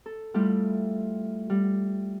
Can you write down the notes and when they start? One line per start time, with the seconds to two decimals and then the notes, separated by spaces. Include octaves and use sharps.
0.06 A4
0.34 G3 A3 E4 F4 G4
1.50 G3